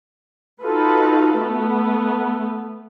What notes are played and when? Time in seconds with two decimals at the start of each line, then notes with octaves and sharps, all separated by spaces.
0.61 D#4 F4 F#4 A4 B4
1.40 A3 B3